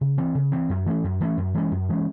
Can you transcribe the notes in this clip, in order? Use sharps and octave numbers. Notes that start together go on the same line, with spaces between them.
C#3
E3 C4
C#3
E3 C4
F#2
E3 A3 C#4
F#2
E3 A3 C#4
F#2
E3 G#3 C#4
F#2
E3 G#3 C#4